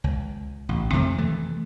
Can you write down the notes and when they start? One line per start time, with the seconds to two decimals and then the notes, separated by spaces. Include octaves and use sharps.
0.04 C#2
0.69 A1
0.93 F2 C3 D#3 A3
1.18 E3 A3